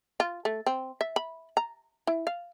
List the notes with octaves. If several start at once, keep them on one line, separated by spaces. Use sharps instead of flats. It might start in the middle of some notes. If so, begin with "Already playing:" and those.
F4
A3
C4
E5
B5
A#5
E4
F5